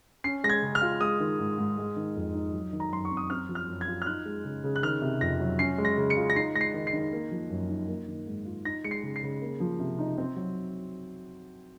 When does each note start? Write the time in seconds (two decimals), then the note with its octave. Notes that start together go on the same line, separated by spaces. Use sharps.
0.24 C#4 C7
0.44 G#3 A#6
0.49 G#6
0.62 C#3
0.75 F6
0.81 F4
1.01 G#3 D#6
1.20 D#3
1.39 G#2
1.58 G#2
1.78 G#3
1.96 D#3
2.16 F2
2.34 D#4
2.54 F#3
2.73 D#3
2.80 A#5
2.91 F#2 C6
3.05 C#6
3.11 C4
3.17 D#6
3.30 C4 F6
3.49 F3
3.55 F6
3.69 F#2
3.81 G#6
3.87 F4
4.02 F6
4.06 D#4 F#6
4.25 G#3
4.45 C#3
4.64 C#3
4.76 F#6
4.83 D#3 F6
5.02 C3
5.21 F2 A#6
5.40 F#3
5.59 C#4 C7
5.78 G#3
5.85 A#6
5.97 C#3
6.10 C#7
6.17 F4
6.30 A#6
6.36 D#4 C7
6.55 G#3 A#6
6.61 C7
6.74 D#3
6.87 C7
6.93 D#3
7.12 A#3
7.31 F3
7.50 F#2
7.69 D#4
7.88 A#3
8.08 D#3
8.27 G#2
8.45 F4
8.65 D#4 A#6
8.84 G#3 C#7
8.91 C7
9.03 C#3
9.16 C7
9.23 C#3
9.42 A#3
9.60 F3
9.80 C3
9.99 D#4
10.18 C4
10.36 F#3